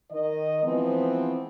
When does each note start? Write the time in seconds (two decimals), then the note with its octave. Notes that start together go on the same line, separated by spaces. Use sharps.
0.11 D#3 D#5
0.63 E3 F3 G#3 B3 C4